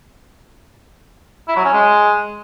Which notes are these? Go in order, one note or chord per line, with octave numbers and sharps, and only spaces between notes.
E4
F#3
C#4
G#3